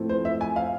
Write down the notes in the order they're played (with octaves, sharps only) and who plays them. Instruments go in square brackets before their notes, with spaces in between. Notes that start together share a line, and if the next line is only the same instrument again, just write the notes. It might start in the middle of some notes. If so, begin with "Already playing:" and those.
Already playing: [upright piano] A2 F3 A3 C4
C5
E5
G#5
F5